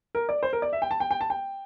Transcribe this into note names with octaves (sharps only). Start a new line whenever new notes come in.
A#4
D5
C5
A#4
D5
E5
G5
A5
G5
G5
A5
G5